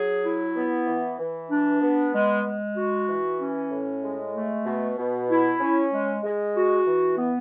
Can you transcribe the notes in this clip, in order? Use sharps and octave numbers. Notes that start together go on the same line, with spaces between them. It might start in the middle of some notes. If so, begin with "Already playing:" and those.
Already playing: F#3 G#4
E4
B3
E3
E3
D4
B3
G#3
G#3
F#4
E3
C#4
A2
G#3
A3
B2
B2
E4
C#4
G#3
G#3
F#4
E3
B3